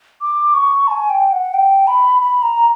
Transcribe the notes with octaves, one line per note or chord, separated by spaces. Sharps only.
D6
C#6
A5
G#5
G5
F#5
G5
B5
B5
A#5